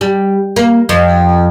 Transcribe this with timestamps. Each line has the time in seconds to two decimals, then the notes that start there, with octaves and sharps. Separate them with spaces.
0.01 G3
0.56 A#3
0.89 F2